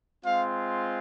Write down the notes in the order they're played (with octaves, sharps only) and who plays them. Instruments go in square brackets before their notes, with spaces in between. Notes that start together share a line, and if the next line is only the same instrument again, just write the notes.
[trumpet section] G#3 C4 F4 F5